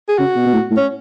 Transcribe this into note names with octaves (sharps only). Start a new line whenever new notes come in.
G#4
C#3 F#4
B2
B2
A2
A2
C#4